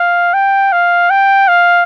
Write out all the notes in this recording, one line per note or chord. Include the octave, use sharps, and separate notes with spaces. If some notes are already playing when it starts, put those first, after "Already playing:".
Already playing: F5
G5
F5
G5
F5